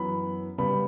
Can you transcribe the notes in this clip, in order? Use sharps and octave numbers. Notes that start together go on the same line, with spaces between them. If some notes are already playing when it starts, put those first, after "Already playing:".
Already playing: F#2 E3 B3 B5
C#3 G3 B3 B5